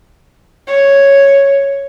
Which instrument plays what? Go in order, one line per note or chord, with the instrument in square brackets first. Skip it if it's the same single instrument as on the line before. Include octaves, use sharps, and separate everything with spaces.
[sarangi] C#5